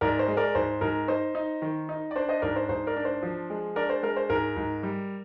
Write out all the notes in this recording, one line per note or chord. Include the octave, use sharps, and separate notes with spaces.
G#2 A#4 D5
C5
G#3
A#4 D5
G#2 C5
G#2 A#4
D#4 C5
D#4
D#3
D#4
D5
D4 C5
C5 D#5
G#2 A#4 D5
C5
G#2 C5
A#4 D5
D4
C5
F3
G#3
D4 A#4 D5
C5
G#3 A#4
C5
G#2 A#4
G#2
G3